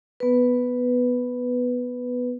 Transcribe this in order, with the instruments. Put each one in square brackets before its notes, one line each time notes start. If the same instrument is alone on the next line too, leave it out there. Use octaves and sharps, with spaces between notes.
[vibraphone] B3 B4